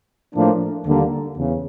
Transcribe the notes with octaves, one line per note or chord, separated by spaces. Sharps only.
A2 F3 A#3 D4
D#2 D3 G3 A#3 D4
E2 C#3